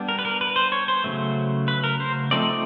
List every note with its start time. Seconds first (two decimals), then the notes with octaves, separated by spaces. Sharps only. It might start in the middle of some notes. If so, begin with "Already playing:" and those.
Already playing: G3 B3 D4
0.09 A#4
0.19 B4
0.25 A#4
0.41 B4
0.56 C5
0.72 C#5
0.88 C5
1.04 C#3 F#3 A3
1.68 B4
1.84 A#4
2.00 C5
2.31 F3 A3 C4 D#4 D5